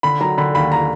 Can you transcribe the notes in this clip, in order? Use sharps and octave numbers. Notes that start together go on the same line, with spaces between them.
D3 B5
F#3 A#5
D3 B5
D#2 B5
A#5